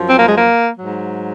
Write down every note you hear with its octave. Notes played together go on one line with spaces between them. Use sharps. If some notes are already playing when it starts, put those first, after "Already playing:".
Already playing: F#2 F3
C4
A#3
G#3
A#3
F#3
G#2